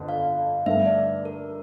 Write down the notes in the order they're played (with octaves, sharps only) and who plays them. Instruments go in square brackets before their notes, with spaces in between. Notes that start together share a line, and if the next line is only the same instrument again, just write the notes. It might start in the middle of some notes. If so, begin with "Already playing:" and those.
Already playing: [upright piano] G1 F2 D3
[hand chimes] F5
[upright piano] G2 D3 A3 [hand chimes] E5
[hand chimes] D5
A#4